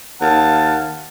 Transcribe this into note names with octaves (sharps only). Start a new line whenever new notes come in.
D#2 F5 F#5 A5